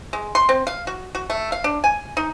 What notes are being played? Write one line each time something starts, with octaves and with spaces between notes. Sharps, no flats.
G#3
C6
C4
F5
F#4
F#4
A3
F5
D4
G#5
D#4